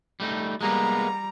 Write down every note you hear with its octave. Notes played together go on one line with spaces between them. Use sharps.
G3 A3 D#4
G3 G#3 A#3 B3 A#5